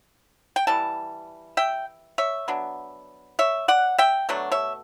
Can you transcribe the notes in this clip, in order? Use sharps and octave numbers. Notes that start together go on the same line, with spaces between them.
G5
E3 G3 A5
E5 G5
C#5 E5
F#3 B3 D4
C#5 E5
D5 F#5
E5 G5
B2 F#3 A3 D4
C#5 E5